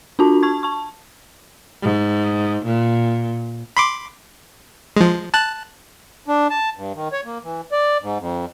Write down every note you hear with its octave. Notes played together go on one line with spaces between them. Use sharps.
D4 F4 F#4 A5
A5 C#6 G#6
A5 C#6
G#2
A#2
B5 C6 D6
F3 G#3
A5 F#6
D4
A5
G2
D#3
C#5
A#3
E3
D5
G#2
F2